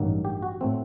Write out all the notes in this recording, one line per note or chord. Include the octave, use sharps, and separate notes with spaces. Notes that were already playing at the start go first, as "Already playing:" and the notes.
Already playing: A1 G2 D#3 F#3 A#3
G4
F#4
A2 A3 C4